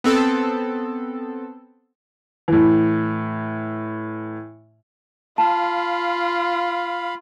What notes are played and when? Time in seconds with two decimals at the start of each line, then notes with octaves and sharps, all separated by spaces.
0.04 B3 C4 A4
2.48 A2 E3
5.38 F4 F5 A5 B5